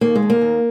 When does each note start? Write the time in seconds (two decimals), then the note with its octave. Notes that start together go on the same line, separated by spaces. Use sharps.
0.01 D#2 A#3
0.15 G#3
0.22 D#2
0.30 A#3
0.41 D#2